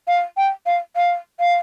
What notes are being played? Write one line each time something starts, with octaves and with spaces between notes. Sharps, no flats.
F5
G5
F5
F5
F5